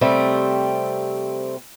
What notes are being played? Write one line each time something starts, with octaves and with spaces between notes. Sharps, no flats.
C3 G3 A3 C4